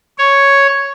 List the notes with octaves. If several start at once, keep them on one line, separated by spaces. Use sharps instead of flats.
C#5